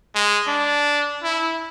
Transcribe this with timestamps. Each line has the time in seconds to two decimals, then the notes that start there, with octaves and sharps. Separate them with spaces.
0.15 G#3
0.47 D4
1.23 E4